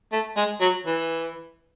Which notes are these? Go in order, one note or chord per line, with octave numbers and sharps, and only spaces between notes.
A3
G#3
F#3
E3